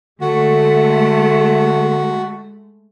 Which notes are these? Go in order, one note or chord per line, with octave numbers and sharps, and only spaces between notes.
D3 G#3 A3 F#4